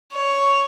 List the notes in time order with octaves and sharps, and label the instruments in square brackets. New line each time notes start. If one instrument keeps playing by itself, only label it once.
[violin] C#5